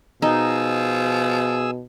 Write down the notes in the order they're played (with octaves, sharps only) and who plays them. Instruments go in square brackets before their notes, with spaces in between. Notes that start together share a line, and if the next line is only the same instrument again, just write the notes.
[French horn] B2 [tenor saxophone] F3 [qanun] D#4 [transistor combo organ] G#4 E6